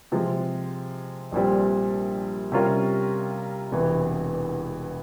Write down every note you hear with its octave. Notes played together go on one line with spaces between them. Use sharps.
C3 F3 G#3
A#1 A#2 G3 C4
C3 G3 C#4 F4 A#4
E1 E2 C3 E3